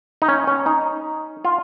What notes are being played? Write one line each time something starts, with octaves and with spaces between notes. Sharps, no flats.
D#4
C#4
C#4
D#4
F4